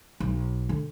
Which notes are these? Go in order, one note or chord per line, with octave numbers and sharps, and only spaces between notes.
B1
D3